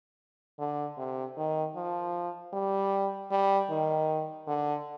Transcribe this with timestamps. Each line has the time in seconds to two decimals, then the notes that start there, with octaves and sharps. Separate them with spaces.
0.59 D3
0.98 C3
1.37 D#3
1.76 F3
2.53 G3
3.31 G3
3.70 D#3
4.48 D3